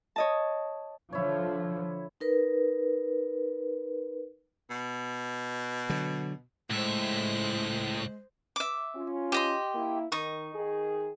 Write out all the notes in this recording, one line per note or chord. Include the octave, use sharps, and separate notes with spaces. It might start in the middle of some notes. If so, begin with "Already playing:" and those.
C#5 D#5 A5
D3 F3 E4 C#5
D#4 A#4 B4
B2
D3 F#3
C#2 A2 G#3 C5 E5 F#6
E5 D6
C#4 F4
G4 D#5 C6
A#3 E4
D#3 D#4 C#6 D#6
D#3 G#4